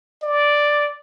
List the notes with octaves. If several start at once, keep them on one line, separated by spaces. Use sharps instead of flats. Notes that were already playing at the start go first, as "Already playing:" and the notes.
D5